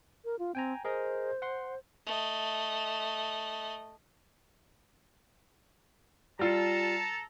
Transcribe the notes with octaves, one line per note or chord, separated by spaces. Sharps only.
A#4
F4
C4 G5 G#5 A#5
G#4 A#4 C5 D#5
F#5 C6
A3 D#5
G3 F4 A4 A5 A#5